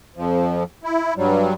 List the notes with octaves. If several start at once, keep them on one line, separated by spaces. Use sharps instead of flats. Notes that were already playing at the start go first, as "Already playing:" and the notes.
F2 F3
E4
G2 F#3 G3